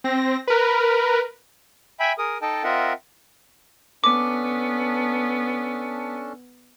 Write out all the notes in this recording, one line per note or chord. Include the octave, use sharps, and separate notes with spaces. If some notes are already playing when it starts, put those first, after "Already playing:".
C4 A#6
A#4 B4
E5 G5 G#5 B5
G#4 A#4 D#6
D#4 A4 D#5 G5 A5
C4 F4 A#4 D#5 E5 F#5
B3 C#4 D4 A4 D6